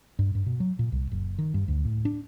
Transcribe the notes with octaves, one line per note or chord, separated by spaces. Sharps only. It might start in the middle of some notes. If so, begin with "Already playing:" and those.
G2
G2
B2
F#3
A#2
C2
F#1
D#3
G2
D2
A2
D4